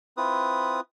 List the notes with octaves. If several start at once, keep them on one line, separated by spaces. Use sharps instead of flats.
C4 E4 F4 B4 D#6